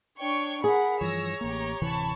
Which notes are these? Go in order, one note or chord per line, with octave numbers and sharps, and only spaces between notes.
D4 C#5 G5 C#6
G#4 A#4 F#5 B5
G2 E3 F3 C#5 E6 A#6
A1 A#3 G4 A#5
D1 C3 E3 A5 B5 C#6